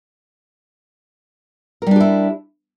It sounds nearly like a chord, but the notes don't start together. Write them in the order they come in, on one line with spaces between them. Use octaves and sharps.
A#4 G3 D4 G4 E4